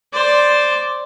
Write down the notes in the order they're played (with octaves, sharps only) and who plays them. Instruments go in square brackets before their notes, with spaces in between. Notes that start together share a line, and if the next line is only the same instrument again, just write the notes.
[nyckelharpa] C5 D5